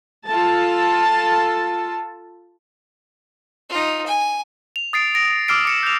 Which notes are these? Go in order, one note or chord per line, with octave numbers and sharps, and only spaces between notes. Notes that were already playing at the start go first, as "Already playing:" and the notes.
F4 A4 A5
D#4 F4
G#5
F7
D#6 A6 C7 D7
A#6 D7
D6 E6 F6 C7 D7
D6 C#7 E7
G6 F7